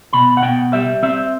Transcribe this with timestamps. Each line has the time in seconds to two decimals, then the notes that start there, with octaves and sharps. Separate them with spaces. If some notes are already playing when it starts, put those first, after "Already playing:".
0.13 B2 B5
0.37 F#5
0.43 B2 G5
0.73 G3 E5
1.03 C4 E5